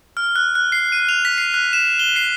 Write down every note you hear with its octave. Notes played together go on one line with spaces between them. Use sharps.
F6
F#6
F#6
C7
D#7
F7
B6
C7
F#6
E7
G7
C7